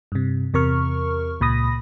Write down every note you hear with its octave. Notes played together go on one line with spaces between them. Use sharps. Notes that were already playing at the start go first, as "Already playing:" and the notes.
G2 C3
E2 C3 A#4 C#6 F6
C#2 A#2 B5 D#6 A#6